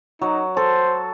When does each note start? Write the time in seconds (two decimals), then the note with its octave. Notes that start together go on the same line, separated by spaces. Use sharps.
0.21 F#3 D#4
0.57 A4 C5